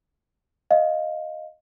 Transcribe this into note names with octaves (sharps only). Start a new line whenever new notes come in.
D#5 F5